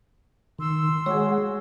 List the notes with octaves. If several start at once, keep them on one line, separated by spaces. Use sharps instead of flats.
D#3 C6 E6
G#3 F#4 G#4 C#5 F#5